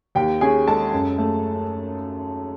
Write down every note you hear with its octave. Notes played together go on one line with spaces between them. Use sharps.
D#2 G4 G5
C#4 G#4 G#5
G#3 A4 A5
F#2
A3